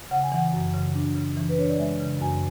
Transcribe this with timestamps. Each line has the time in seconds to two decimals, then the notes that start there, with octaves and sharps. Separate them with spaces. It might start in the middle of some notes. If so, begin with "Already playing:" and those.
0.11 C#3 F#5
0.23 G#5
0.32 E3 F#5
0.53 F#2
0.74 C#3
0.95 D4
1.16 C#3
1.37 E3
1.49 B4
1.58 D4 C#5
1.69 D5
1.79 G#3 E5
2.00 C#3
2.21 F#2 G#5